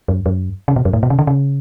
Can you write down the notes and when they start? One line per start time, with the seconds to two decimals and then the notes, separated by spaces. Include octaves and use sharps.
0.08 F#2
0.26 F#2
0.68 C#3
0.76 B2
0.85 F#2
0.93 A2
1.03 B2
1.10 C#3
1.19 D3
1.27 C#3